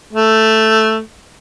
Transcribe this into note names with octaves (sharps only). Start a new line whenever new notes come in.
A3